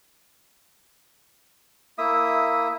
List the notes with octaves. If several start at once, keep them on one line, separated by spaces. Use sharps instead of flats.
A#3 E4 E5 D#6